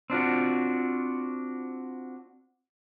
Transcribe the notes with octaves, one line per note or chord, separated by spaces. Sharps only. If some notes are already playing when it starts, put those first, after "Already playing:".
C4 D4 F4 F#4